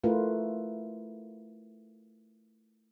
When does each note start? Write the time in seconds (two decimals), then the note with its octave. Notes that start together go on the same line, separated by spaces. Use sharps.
0.04 A3 E4 F4 A#4 B4